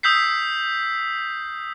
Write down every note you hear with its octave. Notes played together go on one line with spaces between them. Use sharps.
D#6 E6 G6 B6 C7